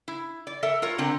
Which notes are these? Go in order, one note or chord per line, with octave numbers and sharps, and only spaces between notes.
E4
D5
A4 A#4 E5
F4 A#4 C#5
D3 C4 A#5